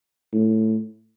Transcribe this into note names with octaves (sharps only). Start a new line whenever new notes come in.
A2